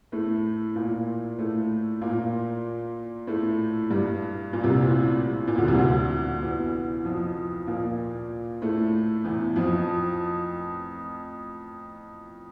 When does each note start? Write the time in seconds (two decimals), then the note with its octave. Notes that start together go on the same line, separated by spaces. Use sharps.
0.12 A2 A3
0.75 A#2 A#3
1.38 A2 A3
2.01 A#2 A#3
3.27 A2 A3
3.90 G2 G3
4.53 A#2
4.63 C2 C3
4.85 A2
5.47 A#2
5.58 D2 D3
5.68 C2 C3
5.78 D2 D3
6.42 E2 E3
7.04 F2 F3
7.67 A#2 A#3
8.62 A2 A3
9.24 E2 E3
9.56 F2 F3